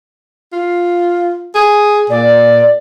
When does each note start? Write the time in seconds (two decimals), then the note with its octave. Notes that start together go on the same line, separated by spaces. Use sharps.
0.53 F4
1.55 G#4
2.10 A#2 D5